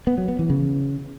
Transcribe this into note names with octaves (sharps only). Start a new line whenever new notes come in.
B3
F#3
B3
E3
C#3